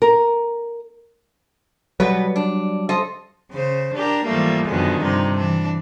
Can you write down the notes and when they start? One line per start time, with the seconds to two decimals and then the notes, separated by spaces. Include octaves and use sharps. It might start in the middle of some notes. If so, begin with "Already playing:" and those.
0.02 A#4
2.00 B2 F#3 G3 B3 B4
2.36 D4
2.89 A4 C5 D#5
3.51 C#3 C5
3.95 D4 G4 A#4
4.26 G#2 E3 F3 G3 A3 A#3
4.66 F#2 B2 D3 D#3 F3 G#3
5.02 G2 C3 D#4
5.37 E3 D4